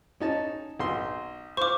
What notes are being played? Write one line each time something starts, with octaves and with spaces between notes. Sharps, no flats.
C#4 D#4 A5
B1 C6
C5 F5 C#6 D6